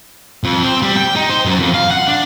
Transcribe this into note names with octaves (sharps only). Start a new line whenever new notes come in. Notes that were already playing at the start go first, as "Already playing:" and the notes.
F2
C4
G3
G5
D#4
C5
F#2
F2
F5
F#5
D4